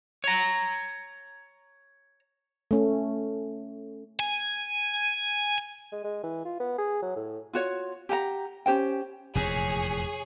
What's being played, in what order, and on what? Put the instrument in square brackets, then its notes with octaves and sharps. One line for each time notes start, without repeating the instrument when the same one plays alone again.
[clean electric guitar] C#5 A#5
[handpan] A3 C#4
[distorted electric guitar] G#5
[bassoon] G#3
G#3
E3
F4
B3
G#4
F#3
A2
[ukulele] F4 F#4 C#5
G4 F#5 G#5 A#5
C#4 G4 C5 G5
[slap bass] F1 E2 A#2 [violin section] G#4 C#5